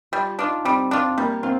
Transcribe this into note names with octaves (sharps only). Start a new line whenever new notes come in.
G3 F4
D4 D#4 F4
G3 C4
C4 D4 F4
G3 A#3
C4 F4